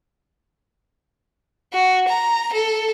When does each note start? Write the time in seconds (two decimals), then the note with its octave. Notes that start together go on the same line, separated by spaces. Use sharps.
1.73 F#4
2.08 A#5
2.52 A4